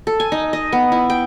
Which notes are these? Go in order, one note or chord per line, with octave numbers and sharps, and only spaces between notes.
A4
G#5
D#4
D#5
B3
E4
G5